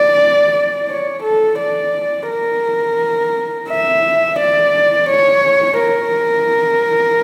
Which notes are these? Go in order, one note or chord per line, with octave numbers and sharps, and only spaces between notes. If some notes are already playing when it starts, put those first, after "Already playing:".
Already playing: D5
C#5
A4
D5
A#4
E5
D5
C#5
A#4